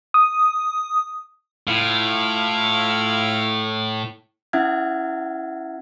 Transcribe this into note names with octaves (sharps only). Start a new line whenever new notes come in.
D#6
A2 E4 F4 F5
C#4 E4 E5 F#5 F6 G#6